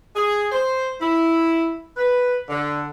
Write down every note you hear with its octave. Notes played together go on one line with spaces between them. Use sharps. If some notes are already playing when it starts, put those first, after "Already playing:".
G#4
C5
E4
B4
D3